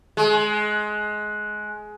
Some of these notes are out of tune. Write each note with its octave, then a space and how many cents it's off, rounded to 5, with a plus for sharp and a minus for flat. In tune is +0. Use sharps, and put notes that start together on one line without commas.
G#3 +20